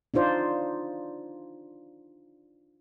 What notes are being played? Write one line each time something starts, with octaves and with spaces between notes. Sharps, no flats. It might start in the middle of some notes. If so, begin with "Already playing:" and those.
D4 D#4 F4 C5 D5